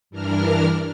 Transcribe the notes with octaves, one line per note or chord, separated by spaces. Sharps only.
G2 E3 D4 A#4 F6